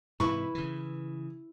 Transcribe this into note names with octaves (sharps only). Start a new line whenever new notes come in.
G#2 C3 E3 E4 B4 C#6
C#3 E3